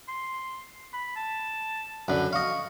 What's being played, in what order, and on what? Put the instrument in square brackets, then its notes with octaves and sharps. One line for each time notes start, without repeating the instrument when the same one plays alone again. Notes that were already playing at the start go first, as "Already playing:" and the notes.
[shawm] C6
B5
A5
[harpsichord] F#2 D3 [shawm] B4
[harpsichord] D#5 F5 [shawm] C#6